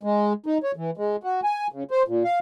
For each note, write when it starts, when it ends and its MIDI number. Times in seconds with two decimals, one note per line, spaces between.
0.03 0.33 56
0.46 0.58 63
0.63 0.72 73
0.76 0.91 52
0.97 1.16 56
1.23 1.40 66
1.44 1.67 80
1.72 1.83 49
1.91 2.03 72
2.08 2.23 46
2.24 2.39 77